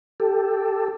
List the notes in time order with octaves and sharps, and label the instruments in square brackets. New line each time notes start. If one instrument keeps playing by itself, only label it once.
[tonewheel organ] G4 A4